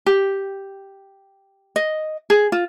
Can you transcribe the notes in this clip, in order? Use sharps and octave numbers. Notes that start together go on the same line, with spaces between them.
G4
D#5
G#4
F4